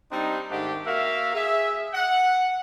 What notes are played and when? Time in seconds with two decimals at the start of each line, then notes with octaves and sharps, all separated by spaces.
0.12 G3 C4 D4 D#4
0.50 G#2 D#3 A3 D4 G4
0.87 A#3 F#4 A#4 E5 F5
1.35 G#4 E5
1.94 F#5